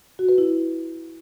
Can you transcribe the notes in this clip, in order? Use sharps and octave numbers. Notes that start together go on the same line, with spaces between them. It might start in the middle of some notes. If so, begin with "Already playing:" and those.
F#4
B4
E4